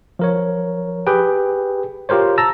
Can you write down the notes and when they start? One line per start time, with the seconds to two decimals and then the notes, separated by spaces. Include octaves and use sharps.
0.19 F3 A#4 C#5
1.07 G4 G#4 B4 G5
2.09 F4 G4 A#4 C5 C#5
2.38 A5 A#5 E6 A6 A#6